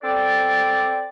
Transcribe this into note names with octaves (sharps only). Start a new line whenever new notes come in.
C4 A4 D5